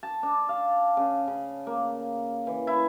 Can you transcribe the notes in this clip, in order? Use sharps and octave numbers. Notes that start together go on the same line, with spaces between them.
A5
D4
F5
C#3
C#3
A#3
E3
E4